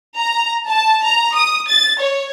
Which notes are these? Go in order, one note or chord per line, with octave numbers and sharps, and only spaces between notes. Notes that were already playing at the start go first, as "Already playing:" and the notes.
A#5
A5
A#5
D#6
A6
C#5